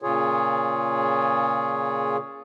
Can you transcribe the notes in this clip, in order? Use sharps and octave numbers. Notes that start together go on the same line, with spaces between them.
A#2 C#3 F4 G#4 C#5